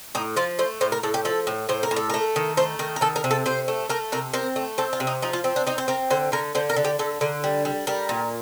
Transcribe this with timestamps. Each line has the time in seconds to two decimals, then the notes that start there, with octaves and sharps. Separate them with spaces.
0.15 A2 D#4
0.36 F3 F4
0.59 A3 C5
0.81 A2 C5
0.92 A#4
1.03 A2 A4
1.14 G4
1.25 F3 A4
1.47 A2
1.69 A2 C5
1.83 A#4
1.91 A2
1.96 A4
2.10 A3 A#4
2.36 D#3
2.57 A3 C5
2.79 D#3 A#4
2.96 A#4
3.01 D#3 A4
3.16 A#4
3.24 C3
3.31 A4
3.46 C3 C5
3.68 A3
3.89 A3 A#4
4.12 C3 A#4
4.33 C4 A#4
4.56 A3
4.78 C4 A4
4.93 F4
5.00 C3
5.07 D#4
5.22 F3 D#4
5.33 F4
5.44 C4
5.56 D4
5.67 C4 D#4
5.78 C5
5.88 C4 A#4
6.10 D3 C5
6.32 D3 A#4
6.55 D3 C5
6.70 A#4
6.76 D3
6.85 G4
6.99 D3 A4
7.21 D3 A#4
7.44 G3
7.65 G3
7.87 G3 A#4
8.09 A#2